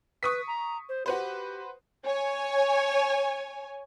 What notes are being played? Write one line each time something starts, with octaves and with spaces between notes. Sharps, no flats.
B4 C#6 D#6 B6
A#5
C5
F#4 G4 B4 C5
C#5 G#5